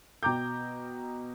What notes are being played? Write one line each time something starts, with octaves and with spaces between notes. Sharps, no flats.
B2 G5 A#5 D6 G6